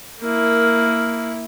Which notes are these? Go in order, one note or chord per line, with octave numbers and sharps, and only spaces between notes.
A#3 E4 A#4